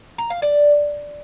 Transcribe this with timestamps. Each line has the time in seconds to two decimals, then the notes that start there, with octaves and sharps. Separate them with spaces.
0.18 A#5
0.30 F5
0.42 D5